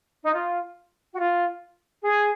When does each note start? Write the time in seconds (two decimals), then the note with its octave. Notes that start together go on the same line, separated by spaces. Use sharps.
0.24 D#4
0.33 F4
1.13 F#4
1.18 F4
2.03 G#4